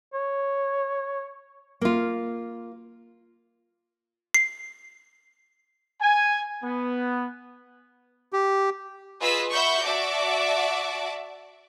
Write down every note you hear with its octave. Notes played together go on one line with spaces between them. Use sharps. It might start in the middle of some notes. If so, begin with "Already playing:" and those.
C#5
A#3 F4
C7
G#5
B3
G4
F4 G#4 B4 D#5 E6 B6
E5 F#5 B5 C#6 G6
F#4 D5 E5 A5 D6